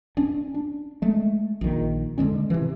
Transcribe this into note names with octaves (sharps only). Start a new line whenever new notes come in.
C#4 D4
D4
G#3 A3
A#1 D#3
D3 E3 G#3 C#4
C3 E3